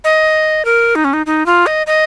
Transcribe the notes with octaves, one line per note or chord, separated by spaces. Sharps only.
D#5
A#4
D#4
C#4
D#4
D#4
F4
D#5
D#5